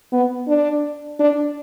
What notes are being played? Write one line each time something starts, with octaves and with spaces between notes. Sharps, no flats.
B3
D4
D4